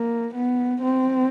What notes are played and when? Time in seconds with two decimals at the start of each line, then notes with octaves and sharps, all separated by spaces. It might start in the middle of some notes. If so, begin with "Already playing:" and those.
Already playing: A#3
0.34 B3
0.82 C4